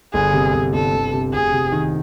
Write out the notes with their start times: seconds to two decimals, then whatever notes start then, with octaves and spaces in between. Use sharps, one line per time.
0.14 G1 G#4
0.33 C3
0.54 G1
0.73 G1 A4
0.94 G1
1.13 C3
1.33 F1 G#4
1.52 C3
1.72 D#3